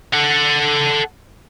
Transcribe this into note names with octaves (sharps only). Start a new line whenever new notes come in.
A4 F#5